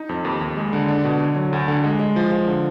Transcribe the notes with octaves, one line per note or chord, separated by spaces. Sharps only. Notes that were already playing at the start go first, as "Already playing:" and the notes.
Already playing: D#4
F2
D#2
D#2
G#3
D3
D4
B2
D3
F#3
D2
D3
G#3
G#3
F3
F3
D3